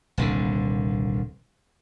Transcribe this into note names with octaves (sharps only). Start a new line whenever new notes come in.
D#1 C2 D3